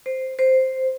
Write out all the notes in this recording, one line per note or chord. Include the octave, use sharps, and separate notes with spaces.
C5
C5